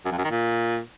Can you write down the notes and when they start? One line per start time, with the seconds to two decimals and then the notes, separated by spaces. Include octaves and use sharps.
0.05 F#2
0.12 F2
0.18 F#2
0.24 D#3
0.31 A#2